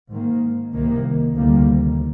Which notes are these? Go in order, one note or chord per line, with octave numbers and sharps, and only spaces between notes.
G#2 D#3 A#3
C2 C3 D#3 A#3
D2 C3 D#3 G3 A#3